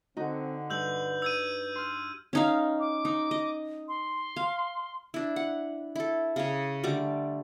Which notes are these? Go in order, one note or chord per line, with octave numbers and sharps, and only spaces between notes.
D3 C4 D#4 F#4
G2 B4 E6 G6 F#7
E6 G#6 D#7
C6 F6
C#4 D#4 F5
D6
D#4
D#5
C6
F5
D4 E4
F#5
E4 A4
C#3 C#5
D3 G3 A3 D6